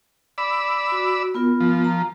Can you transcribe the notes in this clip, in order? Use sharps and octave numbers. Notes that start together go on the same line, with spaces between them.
D5 B5 E6
F#4
B3 F4 A#4
F3
A#5